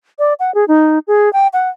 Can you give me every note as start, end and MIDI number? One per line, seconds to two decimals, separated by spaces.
0.19 0.34 74
0.40 0.53 78
0.55 0.65 68
0.68 0.99 63
1.07 1.31 68
1.33 1.47 79
1.53 1.69 78